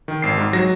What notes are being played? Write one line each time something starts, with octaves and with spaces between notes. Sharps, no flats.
D#3
G#1 C7
G#2
F#3 A#6